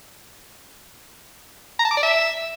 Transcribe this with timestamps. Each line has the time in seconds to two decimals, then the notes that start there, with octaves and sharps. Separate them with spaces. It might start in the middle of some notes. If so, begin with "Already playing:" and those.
1.79 A#5
1.85 A5
1.91 D6
1.97 D5
2.03 E5